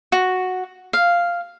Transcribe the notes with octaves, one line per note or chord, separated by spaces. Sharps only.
F#4
F5